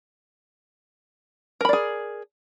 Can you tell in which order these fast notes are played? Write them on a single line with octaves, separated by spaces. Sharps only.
A#4 B5 D5 G#4